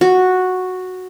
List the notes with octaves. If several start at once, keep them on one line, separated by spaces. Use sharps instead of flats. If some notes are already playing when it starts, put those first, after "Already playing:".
F#4